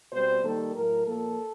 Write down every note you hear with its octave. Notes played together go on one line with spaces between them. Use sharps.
B2 G3 C4 C5
D#3 G3 A#3 A4
A2 F#3 A3 A#4
A#2 F3 A#3 A4